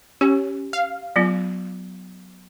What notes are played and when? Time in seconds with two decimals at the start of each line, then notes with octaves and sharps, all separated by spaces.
0.21 C#4 G4
0.73 F5
1.16 F#3 B3 F4